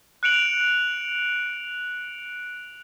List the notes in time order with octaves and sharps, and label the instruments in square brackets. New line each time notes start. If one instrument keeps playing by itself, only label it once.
[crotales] F#6 C#7 D7 F7 F#7